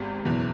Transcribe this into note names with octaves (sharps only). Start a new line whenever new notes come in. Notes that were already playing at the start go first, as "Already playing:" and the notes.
Already playing: G#1 G#2 G4
F#1 E2 B2